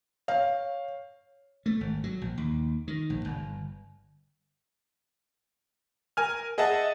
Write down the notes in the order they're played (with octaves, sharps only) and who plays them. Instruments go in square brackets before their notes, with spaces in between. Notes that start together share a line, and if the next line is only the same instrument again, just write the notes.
[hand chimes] C#5 [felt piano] F5
[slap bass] A3
G#1
F#3
A#1
D#2
D#3
A#1
G1
[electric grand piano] A#4 G#5 F6
G#4 D#5 E5 F#5 A5